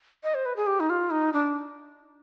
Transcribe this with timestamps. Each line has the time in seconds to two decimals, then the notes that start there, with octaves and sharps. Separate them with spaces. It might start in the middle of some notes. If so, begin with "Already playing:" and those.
0.24 D#5
0.34 C5
0.45 B4
0.56 G#4
0.67 G4
0.80 D#4
0.90 F4
1.10 D#4
1.33 D4